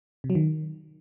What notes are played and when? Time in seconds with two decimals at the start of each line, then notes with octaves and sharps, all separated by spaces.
0.24 C3
0.30 F#3
0.35 D#3